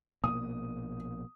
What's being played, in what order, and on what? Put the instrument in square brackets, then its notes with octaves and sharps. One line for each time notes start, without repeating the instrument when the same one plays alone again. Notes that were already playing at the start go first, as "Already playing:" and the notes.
[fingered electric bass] A#1 B2 A#3 [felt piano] D#6